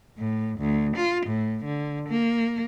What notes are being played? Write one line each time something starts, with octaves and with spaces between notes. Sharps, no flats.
A2
D2
F4
A2
D3
A#3